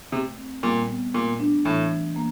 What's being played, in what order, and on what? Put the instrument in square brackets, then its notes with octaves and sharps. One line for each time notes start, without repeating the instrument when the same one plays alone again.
[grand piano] C3 [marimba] A3
[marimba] C4
[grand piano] A#2 [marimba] G3
[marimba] B3
[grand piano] A#2 [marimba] A3
[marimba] D4
[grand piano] A2 [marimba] E3
[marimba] A3
A#3